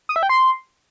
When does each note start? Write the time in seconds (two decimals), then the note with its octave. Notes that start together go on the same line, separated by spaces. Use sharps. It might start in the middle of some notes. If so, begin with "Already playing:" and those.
0.09 D#6
0.16 E5
0.23 G5
0.29 C6